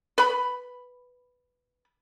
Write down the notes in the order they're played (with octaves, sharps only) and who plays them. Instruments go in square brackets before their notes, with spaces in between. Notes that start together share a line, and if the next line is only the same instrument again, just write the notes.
[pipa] B4 B5